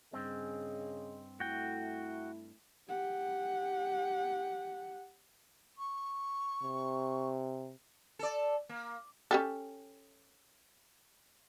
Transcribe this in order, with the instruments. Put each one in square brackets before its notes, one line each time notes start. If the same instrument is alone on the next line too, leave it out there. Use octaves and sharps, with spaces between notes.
[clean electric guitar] G2 C4 [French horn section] C#3 G#4 D#5
[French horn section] A3 E4 [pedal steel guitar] F#4 G5
[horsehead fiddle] G4 F#5
[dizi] C#6
[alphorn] C3
[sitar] A4 D5
A#3
[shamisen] C#4 G4 A4